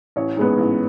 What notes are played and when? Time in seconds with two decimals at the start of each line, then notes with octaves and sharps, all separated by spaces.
0.16 A1 C#5
0.37 G#2 G#3 B3
0.58 A1